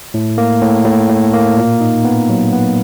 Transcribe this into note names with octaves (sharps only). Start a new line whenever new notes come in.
A2
A#3
A2
A2
A2
A#3
A#2
D#4
B3
F#3
B3